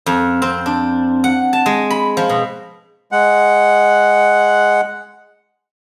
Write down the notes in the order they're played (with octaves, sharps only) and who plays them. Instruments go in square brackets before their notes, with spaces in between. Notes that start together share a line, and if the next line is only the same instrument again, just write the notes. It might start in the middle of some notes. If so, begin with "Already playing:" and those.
[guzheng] F2
C4
D4
F#5
A5
G#3
B5
F3
B2
[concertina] G#3 F#5